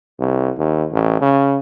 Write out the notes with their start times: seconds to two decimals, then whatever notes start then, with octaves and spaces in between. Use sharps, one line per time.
0.20 C2
0.58 D#2
0.92 A1
1.21 C#3